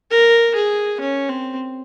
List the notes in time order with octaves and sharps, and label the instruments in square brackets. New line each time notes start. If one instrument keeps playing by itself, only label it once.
[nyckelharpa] A#4
G#4
C#4
C4